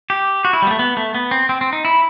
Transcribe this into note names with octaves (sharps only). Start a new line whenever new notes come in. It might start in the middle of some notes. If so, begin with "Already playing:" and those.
G4
F#4
E4
G3
B3
A3
B3
A3
B3
C4
C4
C4
D#4
E4